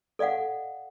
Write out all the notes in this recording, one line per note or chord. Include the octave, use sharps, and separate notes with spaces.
A4 D5 D#5 F5 F#5